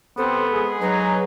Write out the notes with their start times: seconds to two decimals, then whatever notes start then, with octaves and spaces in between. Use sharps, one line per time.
0.17 C3 B3 C4 A4
0.52 G#3 G#4
0.81 F#3 D#4 B4